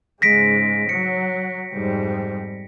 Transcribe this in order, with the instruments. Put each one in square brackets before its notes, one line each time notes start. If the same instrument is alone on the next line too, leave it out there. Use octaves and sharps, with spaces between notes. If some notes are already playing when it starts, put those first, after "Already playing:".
[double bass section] G#2 C#3 G#3 [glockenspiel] A#6 B6 D7
[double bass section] F#3 [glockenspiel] C#7
[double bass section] F2 G#2 G3